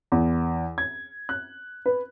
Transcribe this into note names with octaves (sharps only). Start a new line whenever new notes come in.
E2
G#6
F#6
B4